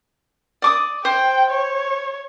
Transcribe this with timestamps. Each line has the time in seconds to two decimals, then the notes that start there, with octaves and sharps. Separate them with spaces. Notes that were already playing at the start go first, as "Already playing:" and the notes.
0.62 D5 D6 D#6
1.05 C5 G5
1.51 C#5